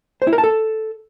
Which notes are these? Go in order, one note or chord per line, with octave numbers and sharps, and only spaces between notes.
C5
E4
A#4
A5
A4